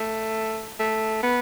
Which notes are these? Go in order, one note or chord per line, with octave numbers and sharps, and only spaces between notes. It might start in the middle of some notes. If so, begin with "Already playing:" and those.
Already playing: A3
A3
B3